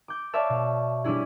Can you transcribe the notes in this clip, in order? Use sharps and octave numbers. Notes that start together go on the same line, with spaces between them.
D6 G6
C#5 D5 E5 F5 A5 C#6
B2
G3 C#4 D4 E4 G#4